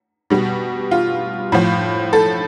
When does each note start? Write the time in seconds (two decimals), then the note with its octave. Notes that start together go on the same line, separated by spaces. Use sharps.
0.30 B2 G3
0.91 F4
1.52 A2 F3
2.13 A4